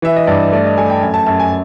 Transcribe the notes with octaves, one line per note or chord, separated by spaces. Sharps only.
E3 E5
D#5
G2 D5
A3 D5
D#5
A3 G#5
G5
F#2 G#5
A5
F#2 A5
G#5